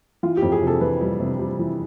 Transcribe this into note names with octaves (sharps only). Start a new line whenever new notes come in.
E3 F4
G4
F2
G#4
C3 A4
E3 B4
G3
C3
G3
E3